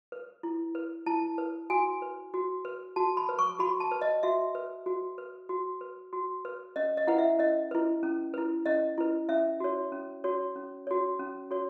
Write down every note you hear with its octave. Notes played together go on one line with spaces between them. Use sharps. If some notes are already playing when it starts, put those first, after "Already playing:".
B4
E4
B4
E4 A5
B4
F#4 G#5
B4
F#4
B4
F#4 A5
B5
B4
C#6
F#4 B5
A5
B4
D#5
F#4 E5
B4
F#4
B4
F#4
B4
F#4
B4
C#4 D#5
D#5
E4 B4 F#5
E5
C#4 D#5
E4 B4
C#4
E4 B4
C#4 D#5
E4 B4
C#4 E5
F#4 C#5
C#4
F#4 C#5
C#4
F#4 C#5
C#4
F#4 C#5